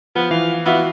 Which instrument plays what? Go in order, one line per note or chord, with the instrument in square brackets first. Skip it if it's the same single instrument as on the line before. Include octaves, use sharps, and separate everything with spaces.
[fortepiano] F3 [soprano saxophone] B3
[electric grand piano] E3 [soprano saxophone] F5
[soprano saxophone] B3 [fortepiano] E4 F#4 F5